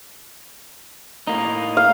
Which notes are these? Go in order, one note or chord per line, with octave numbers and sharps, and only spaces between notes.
A2 A#3 D#4
F5